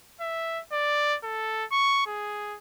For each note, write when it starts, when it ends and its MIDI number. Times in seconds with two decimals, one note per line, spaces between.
0.21 0.61 76
0.72 1.17 74
1.24 1.64 69
1.72 2.05 85
2.06 2.58 68